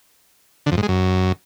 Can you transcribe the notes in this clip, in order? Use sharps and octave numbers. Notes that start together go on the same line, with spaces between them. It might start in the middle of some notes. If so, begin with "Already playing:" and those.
D3
F2
G#2
G#3
F#2